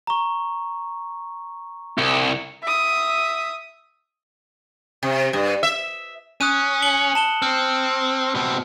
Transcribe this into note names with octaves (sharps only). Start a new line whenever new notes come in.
A#5 C#6
C2 C#7
E5 D#6
C3
G2
E5
C#4 D#6 F#6 D#7
C#7 F#7 G7
A5 E7 G7
C4 F6
B2 C4